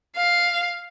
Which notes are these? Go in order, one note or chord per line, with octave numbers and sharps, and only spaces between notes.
F5